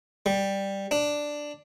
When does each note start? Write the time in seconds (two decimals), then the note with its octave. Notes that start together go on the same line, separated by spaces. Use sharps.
0.26 G3
0.91 D4